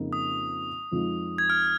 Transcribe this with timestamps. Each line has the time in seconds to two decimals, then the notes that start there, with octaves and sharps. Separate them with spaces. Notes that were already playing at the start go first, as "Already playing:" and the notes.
Already playing: F2 C#3 A#3 D#4
0.13 D#6
0.92 F2 F3 G#3 D#4
1.38 G#6
1.50 F6